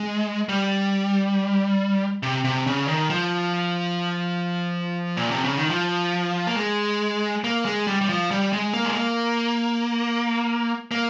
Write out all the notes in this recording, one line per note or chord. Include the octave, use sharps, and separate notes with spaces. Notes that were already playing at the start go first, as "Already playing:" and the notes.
Already playing: G#3
G3
C3
C3
C#3
D#3
F3
A#2
C3
C#3
D#3
F3
A#3
G#3
A#3
G#3
G3
G3
F3
G3
G#3
A#3
G#3
A#3
A#3